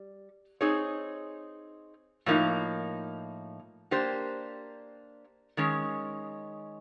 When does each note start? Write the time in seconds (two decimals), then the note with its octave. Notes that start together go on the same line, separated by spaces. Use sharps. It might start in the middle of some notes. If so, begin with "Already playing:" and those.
Already playing: G3
0.61 C4 D#4 G#4 C#5
2.26 A2 F3 A#3 D#4
3.91 A#3 D4 G4 C5
5.57 D#3 G#3 C#4